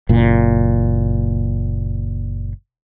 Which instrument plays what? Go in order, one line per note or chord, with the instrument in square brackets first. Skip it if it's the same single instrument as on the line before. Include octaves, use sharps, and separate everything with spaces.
[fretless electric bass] F#1 A#2